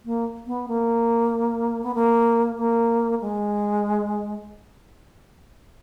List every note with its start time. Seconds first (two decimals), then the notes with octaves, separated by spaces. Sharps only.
0.05 A#3
0.47 B3
0.68 A#3
1.84 B3
1.95 A#3
2.58 A#3
3.21 G#3